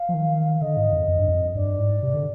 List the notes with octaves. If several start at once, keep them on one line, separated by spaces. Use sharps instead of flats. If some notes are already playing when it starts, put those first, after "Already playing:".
Already playing: F5
F3
D#3
F5
D3 D#5
G#2
F2
F2
G2
F2
G2 D5
G#2
C3
D3